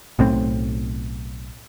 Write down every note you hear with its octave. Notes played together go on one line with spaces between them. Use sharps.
B1 A2 C4